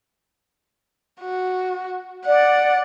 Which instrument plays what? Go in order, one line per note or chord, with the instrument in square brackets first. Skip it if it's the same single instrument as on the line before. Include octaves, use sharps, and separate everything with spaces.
[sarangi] F#4
[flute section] D5 [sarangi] F#5